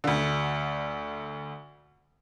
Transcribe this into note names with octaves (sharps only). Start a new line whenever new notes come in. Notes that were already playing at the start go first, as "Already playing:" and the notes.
D2 D3